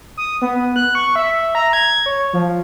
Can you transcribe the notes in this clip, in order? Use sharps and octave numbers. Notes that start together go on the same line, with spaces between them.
D#6
B3
F#6
C#6
E5
A#5
G#6
C#5
F3